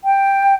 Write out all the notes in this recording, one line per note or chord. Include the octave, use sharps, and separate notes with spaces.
G5